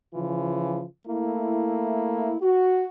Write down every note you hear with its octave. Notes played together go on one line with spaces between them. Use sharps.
C#3 E3 F3 F4
A3 A#3 E4
F#4